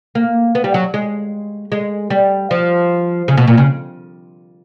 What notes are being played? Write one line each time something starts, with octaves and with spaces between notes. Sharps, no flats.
A#3
B3
G3
F#3
G#3
G#3
G3
F3
C#3
B2
A#2
C#3